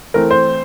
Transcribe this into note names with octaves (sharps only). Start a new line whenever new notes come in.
E3 A3 C4 A#4
C5